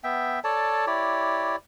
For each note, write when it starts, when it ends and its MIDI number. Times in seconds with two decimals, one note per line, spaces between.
0.04 0.39 59
0.04 0.39 76
0.04 0.39 79
0.44 0.85 69
0.44 0.85 73
0.44 0.85 74
0.44 0.85 81
0.87 1.56 64
0.87 1.56 67
0.87 1.56 73
0.87 1.56 74